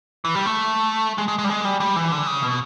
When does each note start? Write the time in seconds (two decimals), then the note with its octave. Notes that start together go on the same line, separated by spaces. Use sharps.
0.25 E3
0.35 G3
0.46 A3
1.18 G#3
1.28 G#3
1.39 G#3
1.44 G3
1.49 G#3
1.65 G3
1.80 G3
1.96 E3
2.12 D3
2.27 C#3
2.43 B2